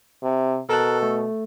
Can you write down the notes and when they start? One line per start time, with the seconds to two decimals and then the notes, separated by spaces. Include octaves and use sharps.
0.23 C3
0.69 B2 A4 A#4 A5 F#6
1.03 A3